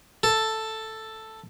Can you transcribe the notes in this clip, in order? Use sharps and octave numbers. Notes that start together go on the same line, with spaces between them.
A4